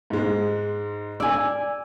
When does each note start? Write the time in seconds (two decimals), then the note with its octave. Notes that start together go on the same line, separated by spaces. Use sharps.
0.10 G#2 G#3
1.20 D5 G#5 E6